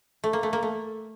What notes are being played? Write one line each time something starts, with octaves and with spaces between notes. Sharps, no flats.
A3
A#3
A3
A#3
A3